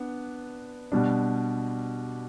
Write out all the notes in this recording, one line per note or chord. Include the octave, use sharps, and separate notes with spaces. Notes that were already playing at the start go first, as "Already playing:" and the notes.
Already playing: B3 D4
B2 G3 D4